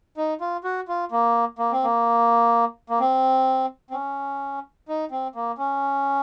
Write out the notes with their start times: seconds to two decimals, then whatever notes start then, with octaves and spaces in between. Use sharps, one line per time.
0.17 D#4
0.41 F4
0.64 F#4
0.88 F4
1.12 A#3
1.59 A#3
1.72 C4
1.84 A#3
2.90 A#3
3.00 C4
3.90 C4
3.94 C#4
4.88 D#4
5.11 C4
5.35 A#3
5.58 C#4